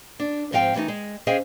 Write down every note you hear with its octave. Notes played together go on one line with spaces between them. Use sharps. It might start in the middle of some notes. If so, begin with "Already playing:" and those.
D4
G#2 F3 C4 F5 G5
E3 A3 D4 D#4
G#3
C#4 G#4 C5 D#5 F5 G5